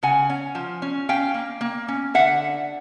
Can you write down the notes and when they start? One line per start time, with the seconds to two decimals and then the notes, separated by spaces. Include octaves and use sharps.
0.03 C#3 F#5 G#5
0.30 C#4
0.55 F3
0.82 C#4
1.09 C#4 F5 G5
1.34 A#3
1.61 A#3
1.88 C#4
2.14 D3 E5 F#5